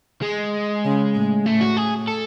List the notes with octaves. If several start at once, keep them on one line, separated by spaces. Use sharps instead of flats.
G#3
C#3
A2
A2 A3
F#4
G#4
A4